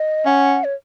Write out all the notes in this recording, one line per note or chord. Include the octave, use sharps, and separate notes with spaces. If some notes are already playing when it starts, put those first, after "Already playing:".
Already playing: D#5
C#4 F#5
C#5